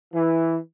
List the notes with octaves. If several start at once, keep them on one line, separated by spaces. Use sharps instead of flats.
E3